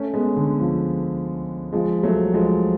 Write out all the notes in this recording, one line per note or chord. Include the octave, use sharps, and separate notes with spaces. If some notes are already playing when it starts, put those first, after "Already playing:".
Already playing: A3 C#4
G#3 B3
D3
F3
F3 G#3
F#3 A3
F3 G#3